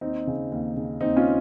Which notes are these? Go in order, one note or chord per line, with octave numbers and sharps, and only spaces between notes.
D#2 C4 D#4
C#3
D#2
C#3
D#2 C4 D#4
C#4 F4